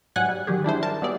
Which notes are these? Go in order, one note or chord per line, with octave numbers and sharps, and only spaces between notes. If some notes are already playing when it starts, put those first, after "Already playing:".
G#2 F#3 G3 F#5 G#5 F#6
G3
D#3 F#3 G4 G#4
G3 D4 E4 C5
A#4 A5
F#3 G3 B3 E4 G#4 D5